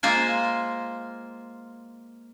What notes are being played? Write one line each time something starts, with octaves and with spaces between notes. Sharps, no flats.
G#3 A#3 F4 C5 G#5